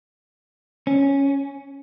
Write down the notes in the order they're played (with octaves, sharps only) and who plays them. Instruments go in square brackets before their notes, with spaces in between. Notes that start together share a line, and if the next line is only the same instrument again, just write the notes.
[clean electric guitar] C#4